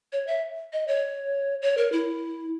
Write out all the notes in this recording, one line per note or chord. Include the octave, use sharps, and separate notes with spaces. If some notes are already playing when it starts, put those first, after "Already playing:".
C#5
E5
D#5
C#5
C#5
A#4
E4